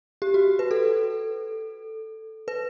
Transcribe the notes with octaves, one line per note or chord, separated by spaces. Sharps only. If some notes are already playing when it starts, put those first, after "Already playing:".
G4
F#4
B4
A4
B4